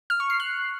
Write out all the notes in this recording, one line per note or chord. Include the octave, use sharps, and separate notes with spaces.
F6
C#6
C7
F#6